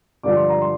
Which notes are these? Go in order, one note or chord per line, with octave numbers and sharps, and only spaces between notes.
G2 D3 F3 D6
C6
A#5
C6